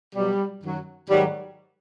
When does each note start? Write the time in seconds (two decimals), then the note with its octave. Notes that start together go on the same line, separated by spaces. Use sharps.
0.15 B2 F#3 G3
0.62 F#2 D#3 F#3
1.09 G#2 D#3 F#3 G3